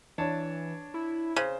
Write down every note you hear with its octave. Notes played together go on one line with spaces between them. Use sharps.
E3 D4 C#5 A5
E4
C#3 C5